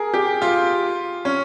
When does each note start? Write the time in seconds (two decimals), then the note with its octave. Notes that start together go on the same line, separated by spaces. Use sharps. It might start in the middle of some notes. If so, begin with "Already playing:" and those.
Already playing: G#4 A#4
0.14 G4
0.42 F4
1.25 C#4